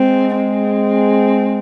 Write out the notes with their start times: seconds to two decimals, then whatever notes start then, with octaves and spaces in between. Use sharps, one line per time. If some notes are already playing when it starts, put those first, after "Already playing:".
Already playing: G#3 C4
0.36 C4